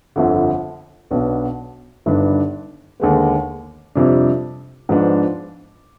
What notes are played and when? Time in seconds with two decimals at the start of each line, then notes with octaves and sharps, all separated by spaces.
0.16 G1 F2 D3
1.11 B1 B2 B3 D4
2.06 G1 G2 D#3 B3 D4
3.00 D#2 D3 G#3 B3
3.95 F2 C3 G3 D4
4.89 G#2 F3 B3 D4